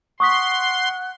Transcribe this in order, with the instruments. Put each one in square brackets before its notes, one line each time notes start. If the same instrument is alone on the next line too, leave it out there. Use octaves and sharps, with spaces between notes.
[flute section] F#5 F#6 [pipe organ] C6 [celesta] C#6 D#6 B6